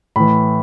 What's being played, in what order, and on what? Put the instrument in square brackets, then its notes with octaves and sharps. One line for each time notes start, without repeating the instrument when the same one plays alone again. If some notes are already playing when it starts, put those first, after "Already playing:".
[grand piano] A2 E3 B5